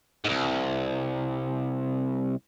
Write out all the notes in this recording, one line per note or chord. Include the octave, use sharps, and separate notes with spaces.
C2 G#2